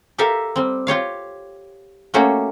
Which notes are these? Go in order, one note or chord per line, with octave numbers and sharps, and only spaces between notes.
G4 A4 A#4 E5 F5
G3 C4
F4 G4 C#5 F5
A3 A#3 C#4 F#4 G4